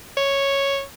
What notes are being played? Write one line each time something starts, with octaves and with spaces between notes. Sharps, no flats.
C#5